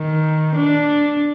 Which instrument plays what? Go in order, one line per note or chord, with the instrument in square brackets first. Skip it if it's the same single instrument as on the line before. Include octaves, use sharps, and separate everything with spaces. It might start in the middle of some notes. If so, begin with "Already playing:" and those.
Already playing: [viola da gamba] D#3
D4